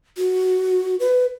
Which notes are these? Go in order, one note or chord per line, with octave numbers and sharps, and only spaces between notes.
F#4
B4